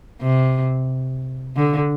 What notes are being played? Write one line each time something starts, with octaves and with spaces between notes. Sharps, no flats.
C3
D3